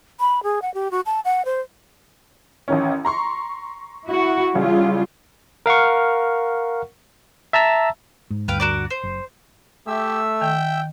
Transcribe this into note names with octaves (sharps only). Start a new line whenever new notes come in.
B5
G#4
F#5
G4
F#4
A5
F#5
C5
A1 D#3 C#4
A#5 C6 C#6
E4 F#4
A1 C#3 G3 F4
A#4 F5 F#5 C#6
E5 A5 A#5 E6
G#2
D2 G2 B4 F5 G5
F#4 A#4 D5
C5
F#1
A3 G4 E5 E6
D#3 G5